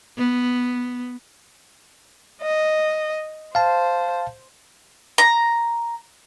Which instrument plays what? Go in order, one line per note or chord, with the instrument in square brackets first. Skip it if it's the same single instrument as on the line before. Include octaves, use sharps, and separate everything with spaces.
[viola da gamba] B3
[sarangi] D#5
[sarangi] C5 [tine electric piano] F5 A5
[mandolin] A#5